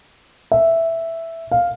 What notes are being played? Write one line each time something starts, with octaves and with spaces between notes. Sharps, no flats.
E5
F5